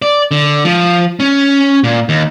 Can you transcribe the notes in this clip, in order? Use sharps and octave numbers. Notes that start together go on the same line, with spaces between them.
D5
D3
F3
C#4
A#2
D#2